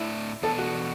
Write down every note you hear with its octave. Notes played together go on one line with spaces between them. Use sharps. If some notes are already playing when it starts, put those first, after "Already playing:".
Already playing: A2 A3 D4 E4
E2 B2 B3 D4 A4
F#4